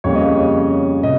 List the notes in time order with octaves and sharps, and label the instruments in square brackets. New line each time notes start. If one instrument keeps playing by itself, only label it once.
[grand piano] F2 C#3 G3 A#3 C#5
D#5
C#5
C3 D#5